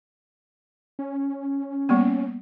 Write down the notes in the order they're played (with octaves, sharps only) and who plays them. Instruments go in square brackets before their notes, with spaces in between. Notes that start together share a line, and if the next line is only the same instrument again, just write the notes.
[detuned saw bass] C#4
[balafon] G3 A#3 B3